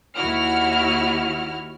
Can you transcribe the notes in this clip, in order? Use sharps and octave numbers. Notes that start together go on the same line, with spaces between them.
D#2 E4 F#4 F6